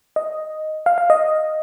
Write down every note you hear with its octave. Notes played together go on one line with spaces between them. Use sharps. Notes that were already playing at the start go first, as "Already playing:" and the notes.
D#5
F5
F5
D#5